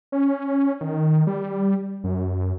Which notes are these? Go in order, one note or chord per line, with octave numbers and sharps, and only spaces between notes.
C#4
D#3
G3
F#2